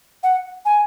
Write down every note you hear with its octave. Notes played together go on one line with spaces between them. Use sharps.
F#5
G#5